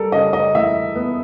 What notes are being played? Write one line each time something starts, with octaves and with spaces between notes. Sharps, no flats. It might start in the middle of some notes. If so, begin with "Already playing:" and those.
Already playing: G3 A4 A#4
C#3 D#5
D#5
E3 E5
B3